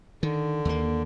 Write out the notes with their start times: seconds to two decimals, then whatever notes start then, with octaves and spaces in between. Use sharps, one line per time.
0.23 D3 D#3
0.65 D#2 A#3